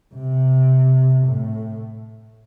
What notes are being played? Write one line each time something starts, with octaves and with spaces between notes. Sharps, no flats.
C3
A2